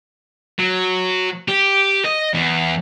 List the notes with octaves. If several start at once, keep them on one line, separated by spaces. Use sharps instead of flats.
F#3
G4
D#5
E2